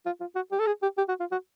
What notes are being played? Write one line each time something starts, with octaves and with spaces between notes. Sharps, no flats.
F4
F4
F#4
G4
A4
G#4
G4
G4
F#4
F4
F#4